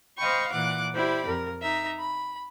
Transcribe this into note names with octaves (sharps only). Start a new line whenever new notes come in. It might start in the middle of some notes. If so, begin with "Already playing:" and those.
C5 D#5 F5 G5 B5 C#6
A#2 E3 F#5 D6 F#6
E4 G4 C5 D5 B5
F2 A#4
D#4 E5 A#5
B5